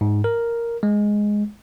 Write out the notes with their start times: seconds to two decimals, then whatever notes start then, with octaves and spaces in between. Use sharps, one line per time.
0.01 G#2
0.24 A#4
0.83 G#3